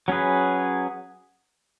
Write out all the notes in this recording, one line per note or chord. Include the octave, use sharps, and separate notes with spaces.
F#3 C#4 G#4 B4